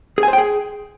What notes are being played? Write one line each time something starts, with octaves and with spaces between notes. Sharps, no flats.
G#4
G#5
C5
G5
G#4